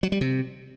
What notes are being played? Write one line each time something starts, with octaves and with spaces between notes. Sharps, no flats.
F#3
G3
C3